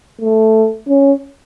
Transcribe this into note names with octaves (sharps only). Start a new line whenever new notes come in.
A3
C#4